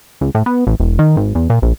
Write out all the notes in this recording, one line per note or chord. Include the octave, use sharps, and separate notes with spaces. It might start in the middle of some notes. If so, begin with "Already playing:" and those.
C#2
A2
B3
A1
E1
D#3
G#1
E2
A#2
A#1